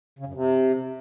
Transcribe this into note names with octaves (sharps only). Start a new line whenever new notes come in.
C#3
F#2
C3